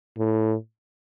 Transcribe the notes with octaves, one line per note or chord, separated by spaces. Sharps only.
A2